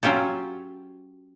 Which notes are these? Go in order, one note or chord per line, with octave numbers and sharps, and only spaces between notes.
F#3 C#4 F4 G4 A4